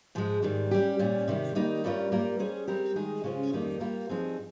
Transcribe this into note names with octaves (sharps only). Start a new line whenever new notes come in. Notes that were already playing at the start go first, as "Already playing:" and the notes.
G#2 F3 G#3
G#2 D#3 G3
G3 C#4 G4
A#2 G3 C#4
C3 D#3 G3
D#3 G3 A#3 D#4
G2 G3 C#4 F4 A#4
G3 A#3 F4 A#4
G3 C#4 G#4 C5
G3 C4 G4 A#4
D#3 G#3 D#4 G#4
C#3 G#3 C#4 F4 C5
F2 D#3 G3 A#3 D#4
G3 A#3 F4 A#4
G2 F3 C4 D#4 G#4